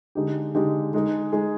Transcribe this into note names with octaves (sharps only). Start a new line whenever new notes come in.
D3 G#3 D#4 G4
D3 G#3 D#4 G4
G#3 D#4 G#4
G#3 D#4 G#4